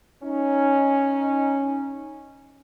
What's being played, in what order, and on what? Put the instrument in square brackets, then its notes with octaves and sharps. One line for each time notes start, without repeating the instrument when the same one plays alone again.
[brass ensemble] C#4 D#4